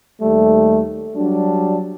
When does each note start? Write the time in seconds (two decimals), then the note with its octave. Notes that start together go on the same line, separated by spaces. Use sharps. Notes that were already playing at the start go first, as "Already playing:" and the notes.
0.21 D#2 G3 A3
1.16 F#3 G3 D4